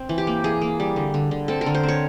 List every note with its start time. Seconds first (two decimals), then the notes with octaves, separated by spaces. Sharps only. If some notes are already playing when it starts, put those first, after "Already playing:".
Already playing: C4
0.09 E3
0.18 G4
0.27 A#3
0.44 E3 G#4
0.62 A#3
0.80 G3
0.96 D3
1.14 D3
1.31 D3
1.48 C4 A4
1.61 A#4
1.66 D3
1.74 C5
1.83 C4
1.88 C#5